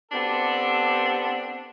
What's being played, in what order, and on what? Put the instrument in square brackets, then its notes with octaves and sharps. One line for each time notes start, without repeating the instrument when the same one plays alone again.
[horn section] B3 C4 D4 G4 A4